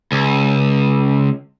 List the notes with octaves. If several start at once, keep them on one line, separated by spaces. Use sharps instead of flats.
C#2